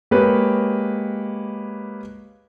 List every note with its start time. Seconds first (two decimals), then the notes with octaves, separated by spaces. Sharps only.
0.11 G#3 A#3 G4 B4 C#5